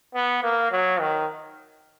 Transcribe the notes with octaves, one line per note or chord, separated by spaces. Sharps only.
B3
A#3
F#3
D#3